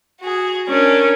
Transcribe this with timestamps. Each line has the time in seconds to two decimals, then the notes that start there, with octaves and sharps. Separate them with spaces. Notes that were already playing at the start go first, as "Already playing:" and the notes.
0.20 F#4 G#4
0.68 C#4 D4 A#4